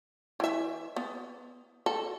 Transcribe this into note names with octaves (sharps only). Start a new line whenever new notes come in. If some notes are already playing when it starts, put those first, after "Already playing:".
E3 E5
B3
A4